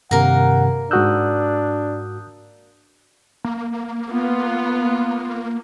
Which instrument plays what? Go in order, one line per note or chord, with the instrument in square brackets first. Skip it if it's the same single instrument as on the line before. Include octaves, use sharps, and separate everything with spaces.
[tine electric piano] G2 C3 D#3 [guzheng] A#3 A#4 [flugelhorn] F#5
[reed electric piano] G#2 F#4 E6 [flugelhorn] D4 [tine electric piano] D#6 F#6 G6
[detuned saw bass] A#3
[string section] B3 F4